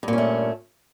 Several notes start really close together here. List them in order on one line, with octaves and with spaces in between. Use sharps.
G2 A#2 C#4 A3